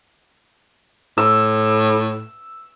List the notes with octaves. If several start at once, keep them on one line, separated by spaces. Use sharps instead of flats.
A2 E6